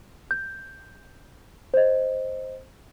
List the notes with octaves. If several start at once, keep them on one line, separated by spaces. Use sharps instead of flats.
G6
C5 D#5